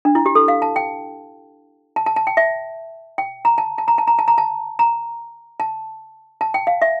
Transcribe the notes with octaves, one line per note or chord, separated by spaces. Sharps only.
D4
E4
G4
A4
F5
A5
G5
A5
A5
A5
G5
E5
G5
A#5
A5
A5
A#5
A5
A#5
A5
A#5
A5
A#5
A5
A5
G5
F5
E5